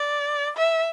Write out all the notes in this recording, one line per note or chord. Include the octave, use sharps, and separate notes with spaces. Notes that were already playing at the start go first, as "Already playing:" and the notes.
Already playing: D5
E5